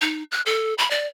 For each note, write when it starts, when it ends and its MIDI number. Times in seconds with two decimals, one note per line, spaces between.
0.02 0.23 63
0.32 0.42 90
0.46 0.74 69
0.78 0.91 83
0.91 1.07 74